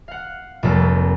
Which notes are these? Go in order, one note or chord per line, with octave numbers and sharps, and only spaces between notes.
F5 F#5
F1 C2 F2 A#3 A4